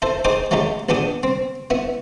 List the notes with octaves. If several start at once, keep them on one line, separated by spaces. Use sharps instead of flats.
E4 A4 C5
D#4 G#4 C5 G5 D6 D#6
F#3 G#3 A3 D#4 G4
A#1 B3 D4 G4 D#6
C4
B3 E4